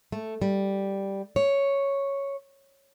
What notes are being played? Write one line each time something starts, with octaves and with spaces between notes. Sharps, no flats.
A3
G3
C#5